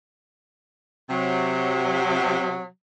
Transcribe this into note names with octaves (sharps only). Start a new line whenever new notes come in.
C3 F#3